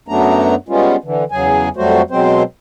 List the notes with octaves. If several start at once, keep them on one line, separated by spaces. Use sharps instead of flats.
F#2 F#3 A3 B3 D4 A#5
G3 G#3 B3 C#4 F4
D3 E3
E2 C#3 F#3 G#4 G#5
F2 F#3 G3 A3 F#4 C5
B2 F#3 G#3 C4 C5